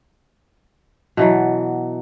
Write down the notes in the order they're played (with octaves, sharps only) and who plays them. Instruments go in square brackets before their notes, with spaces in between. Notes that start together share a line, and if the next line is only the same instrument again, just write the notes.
[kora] B2 E3 F#3